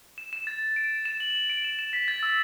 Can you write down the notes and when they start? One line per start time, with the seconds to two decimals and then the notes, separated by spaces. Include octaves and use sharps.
0.18 E7
0.33 E7
0.47 A6
0.76 D7
1.05 E7
1.20 F#7
1.35 E7
1.50 D7
1.64 E7
1.79 E7
1.93 B6
2.08 A6
2.23 E6